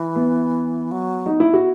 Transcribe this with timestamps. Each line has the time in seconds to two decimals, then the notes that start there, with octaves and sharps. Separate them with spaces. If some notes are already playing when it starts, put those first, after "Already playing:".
Already playing: E3
0.16 B3
0.91 F#3
1.26 D#4
1.40 E4
1.53 F#4